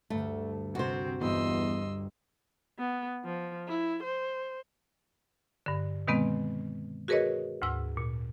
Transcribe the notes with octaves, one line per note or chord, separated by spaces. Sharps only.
D2 G2 A3
C3 C4 F#4 C5
G1 E2 G2 D#5 C6 E6
B3
F3
E4
C5
G2 D3
B2 D#3 G#3 B3 C4
F#4 G#4 A#4 B4 C#5 D#5
D2 G#2 E6
A#2